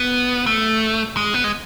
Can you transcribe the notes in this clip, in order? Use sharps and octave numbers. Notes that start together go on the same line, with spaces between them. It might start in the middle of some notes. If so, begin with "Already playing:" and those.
Already playing: B3
A3
G#3
B3
G#3